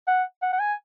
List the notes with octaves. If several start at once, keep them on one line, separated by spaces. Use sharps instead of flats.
F#5
F#5
F#5
G#5